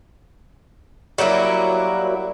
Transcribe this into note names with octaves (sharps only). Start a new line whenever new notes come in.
F#3 G3 A#3 E4